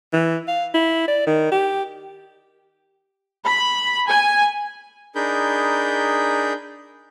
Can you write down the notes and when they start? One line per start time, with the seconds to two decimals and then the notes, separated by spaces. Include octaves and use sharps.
0.13 E3
0.48 F5
0.74 E4
1.08 D5
1.27 D#3
1.51 G4
3.46 B5
4.08 G#5
5.15 D4 D#4 G#4 A#4 B5 G6